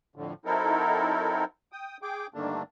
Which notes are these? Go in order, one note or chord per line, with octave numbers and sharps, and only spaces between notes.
F2 A2 D3
F#3 C4 D#4 E4 A4 A#4
G5 D#6
G#4 G5 D6
G2 D3 D#3 A3 A#3 D4